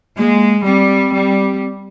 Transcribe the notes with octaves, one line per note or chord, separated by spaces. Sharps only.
G#3 A#3
G3 C4
G3